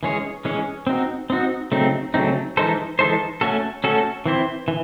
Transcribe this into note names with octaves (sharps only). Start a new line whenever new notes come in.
E3 G#3 C#4 G#4 C#5
E3 G#3 C#4 G#4 C#5
C4 D#4 F#4
C4 D#4 F#4
C#3 F#3 A3 C4 D#4
C#3 F#3 A3 C4 D#4
E3 G#3 D#4 A4 C5
E3 G#3 D#4 A4 C5
A3 C#4 F#4 A4
A3 C#4 F#4 A4
E3 C4 E4 C5
E3